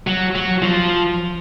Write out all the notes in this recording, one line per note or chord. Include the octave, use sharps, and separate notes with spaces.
F#3
F#3
F3